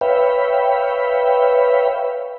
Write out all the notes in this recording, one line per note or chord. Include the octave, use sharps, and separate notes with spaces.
B4 C#5 E5 F5 G5 B5